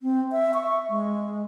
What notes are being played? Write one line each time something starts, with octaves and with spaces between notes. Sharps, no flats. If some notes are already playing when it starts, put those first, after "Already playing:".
C4
E5
C#6
G#3